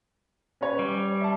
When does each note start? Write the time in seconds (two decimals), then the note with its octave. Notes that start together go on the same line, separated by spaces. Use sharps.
0.61 C#4 B4 C#5
0.79 G3
1.21 E5 A5